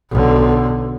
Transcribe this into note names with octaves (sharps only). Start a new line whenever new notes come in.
B1 D3